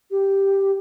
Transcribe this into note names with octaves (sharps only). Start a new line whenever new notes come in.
G4